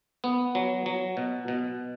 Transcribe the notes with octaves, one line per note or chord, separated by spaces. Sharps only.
B3
F#3
F#3
B2
B2